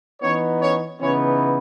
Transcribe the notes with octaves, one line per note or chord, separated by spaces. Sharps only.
E3 B3 C#4 D#4 C#5
C#4 C#5
C#3 E3 B3 C#4 D#4 C#5